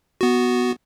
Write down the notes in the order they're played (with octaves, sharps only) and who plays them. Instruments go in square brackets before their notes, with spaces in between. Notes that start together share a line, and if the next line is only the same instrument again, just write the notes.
[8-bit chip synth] B3 F#4